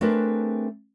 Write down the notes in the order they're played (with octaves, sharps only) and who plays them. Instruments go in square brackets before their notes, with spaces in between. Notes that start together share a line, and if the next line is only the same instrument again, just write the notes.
[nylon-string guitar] A3 C4 D4 G#4 A#4 B4